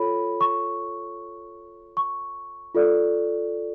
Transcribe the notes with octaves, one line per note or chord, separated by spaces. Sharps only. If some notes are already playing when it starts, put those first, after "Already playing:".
Already playing: F4 A4 C#5 B5
C#6
C#6
F4 A4 D5